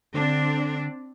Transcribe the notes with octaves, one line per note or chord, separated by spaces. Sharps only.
D3 C4 D4